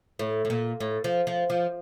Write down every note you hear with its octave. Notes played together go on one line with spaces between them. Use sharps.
A2
A2
A#2
A2
F3
F3
F3